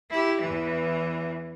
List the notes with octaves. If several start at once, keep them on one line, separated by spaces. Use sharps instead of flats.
E4 G4
E2 E3